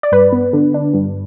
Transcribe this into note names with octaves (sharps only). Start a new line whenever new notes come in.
D5
G2 B4
B3
D3
D4
G2